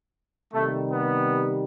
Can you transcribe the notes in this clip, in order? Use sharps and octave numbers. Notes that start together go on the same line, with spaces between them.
C3 D#3 G3 A3
B3